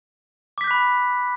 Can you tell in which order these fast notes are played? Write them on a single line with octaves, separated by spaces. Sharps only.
D6 B6 G6 F#6 B5